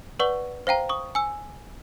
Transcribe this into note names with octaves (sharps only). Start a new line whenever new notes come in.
B4 D5 F#5 C#6 F#7 G7
C5 F5 G5 A#5
C#6 D#6
G#5 E6